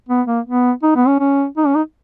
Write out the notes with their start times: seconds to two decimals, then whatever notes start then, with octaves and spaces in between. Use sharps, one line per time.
0.09 B3
0.27 A#3
0.46 B3
0.83 D#4
0.96 B3
1.07 C#4
1.20 C#4
1.57 D#4
1.67 C#4
1.75 D#4